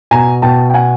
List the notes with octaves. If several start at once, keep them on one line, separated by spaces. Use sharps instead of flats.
B2 G#5 A#5
B2 G5 A5
G5
F#5 G#5